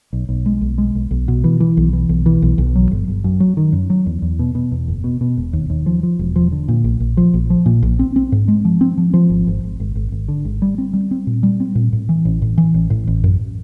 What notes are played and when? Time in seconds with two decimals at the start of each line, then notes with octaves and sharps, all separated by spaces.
0.13 B1
0.29 B1
0.46 G#3
0.61 B1
0.78 G#3
0.95 B1
1.11 B1
1.28 B2
1.44 E3
1.60 E3
1.77 B1
1.93 E3
2.09 B1
2.26 E3
2.42 B1
2.58 B1
2.75 F#3
2.91 G1
3.08 G1
3.24 F#2
3.40 F#3
3.57 D#3
3.73 F#2
3.90 F#3
4.06 E2
4.22 E2
4.39 B2
4.55 B2
4.72 E2
4.88 F#1
5.04 B2
5.21 B2
5.37 E1
5.53 D#2
5.70 D#2
5.86 F3
6.03 F3
6.19 E1
6.36 F3
6.52 D3
6.68 A#2
6.84 A#1
7.00 A#1
7.17 F3
7.34 A#1
7.50 F3
7.66 A#2
7.83 A#1
7.99 C4
8.16 C4
8.32 G#2
8.48 G#3
8.65 F3
8.81 C4
8.98 F3
9.14 F3
9.30 G#1
9.47 G#1
9.64 G#1
9.80 G#1
9.95 G#1
10.12 G#1
10.28 D3
10.45 G#1
10.62 G3
10.78 C4
10.93 G3
11.11 C4
11.27 A#2
11.43 G3
11.60 C4
11.75 A#2
11.93 A2
12.09 E3
12.25 A1
12.42 A2
12.58 E3
12.74 A1
12.90 A2
13.07 A1
13.24 F#2